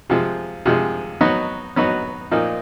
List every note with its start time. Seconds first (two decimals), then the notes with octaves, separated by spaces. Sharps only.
0.10 C3 F3 G#3
0.66 C3 F3 G#3
1.21 F#3 B3 D#4 F#4
1.76 F#3 B3 D#4 F#4
2.31 A#2 F3 A#3 D#4